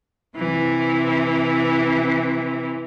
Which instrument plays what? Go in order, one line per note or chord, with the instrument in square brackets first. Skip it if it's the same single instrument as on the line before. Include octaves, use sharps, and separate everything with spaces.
[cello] C3 E3